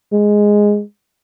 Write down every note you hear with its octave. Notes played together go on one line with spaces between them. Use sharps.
G#3